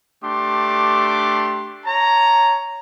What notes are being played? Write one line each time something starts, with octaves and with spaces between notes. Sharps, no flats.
A3 D4 G4 C6 D6
C#5 A5 A#5